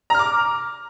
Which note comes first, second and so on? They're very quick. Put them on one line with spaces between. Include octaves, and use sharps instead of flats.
A#5 F6 D6